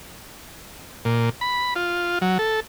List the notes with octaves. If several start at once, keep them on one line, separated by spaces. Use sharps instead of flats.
A#2
B5
F4
F#3
A4